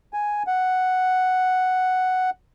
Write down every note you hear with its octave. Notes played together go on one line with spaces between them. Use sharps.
G#5
F#5